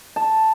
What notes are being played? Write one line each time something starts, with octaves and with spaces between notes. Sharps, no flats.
A5